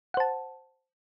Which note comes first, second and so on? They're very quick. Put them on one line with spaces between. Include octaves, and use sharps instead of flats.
F#5 C5 A5